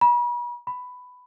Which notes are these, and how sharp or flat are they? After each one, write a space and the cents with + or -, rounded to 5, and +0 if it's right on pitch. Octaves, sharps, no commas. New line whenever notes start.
B5 -40
B5 +10